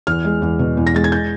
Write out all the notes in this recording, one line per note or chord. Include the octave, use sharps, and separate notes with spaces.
E2 F6
G#3
E2
B2
E2
A#6
G#3 A6
G#6
G6